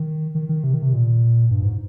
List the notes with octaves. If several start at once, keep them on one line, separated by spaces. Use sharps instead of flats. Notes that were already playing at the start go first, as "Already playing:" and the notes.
Already playing: D#3
D#3
D#3
C3
D#3
C3
A#2
G2
G#2